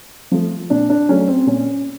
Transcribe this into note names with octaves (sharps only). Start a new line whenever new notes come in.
F3 A3
A#2 D4
D4
F#3 A3 C#4
C4
A#2 C#4